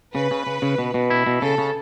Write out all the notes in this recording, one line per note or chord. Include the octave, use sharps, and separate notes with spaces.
C#3 B4
C#3
C#3
C#3
B2
B2
E4
B2
C#3 A4
C#3